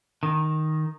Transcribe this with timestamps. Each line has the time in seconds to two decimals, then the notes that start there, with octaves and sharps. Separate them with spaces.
0.23 D#3